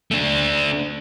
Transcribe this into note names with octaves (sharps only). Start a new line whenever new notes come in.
A3 D4